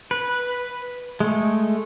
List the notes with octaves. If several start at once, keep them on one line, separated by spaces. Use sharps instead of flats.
B4
G#3 A3